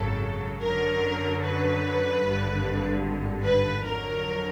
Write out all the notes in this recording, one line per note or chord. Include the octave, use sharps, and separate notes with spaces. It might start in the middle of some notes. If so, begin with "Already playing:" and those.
Already playing: G#1 F#2 C#3 F#3 A4
F#2 D3 F#3 A#4
B4
G#1 G2 D3
B4
F2 D3 F#3 A#4